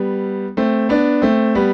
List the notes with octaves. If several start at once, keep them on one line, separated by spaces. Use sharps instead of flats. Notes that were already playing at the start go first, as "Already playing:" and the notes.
Already playing: G3 B3
A3 C4
B3 D4
A3 C4
G3 B3